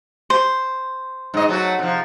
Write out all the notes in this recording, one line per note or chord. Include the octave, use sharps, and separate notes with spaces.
C5
G#2 D#5
F#3 A3 F#4
C3 F3